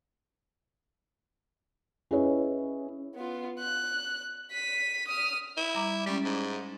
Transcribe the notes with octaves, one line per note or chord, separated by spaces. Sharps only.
C#4 E4 G#4 B4 C#5 D#5
B3 F4
F#6
B6 D#7
D#6 F6
E4
G3 A#5 D6
G3 G#3 C#4
G#2